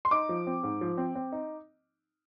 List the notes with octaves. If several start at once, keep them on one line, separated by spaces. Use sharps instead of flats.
C6
D#4 D6
F3
C4
G#2
F3
C4
C4
D#4